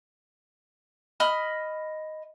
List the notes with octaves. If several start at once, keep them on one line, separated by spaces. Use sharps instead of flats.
D#5 B5 F6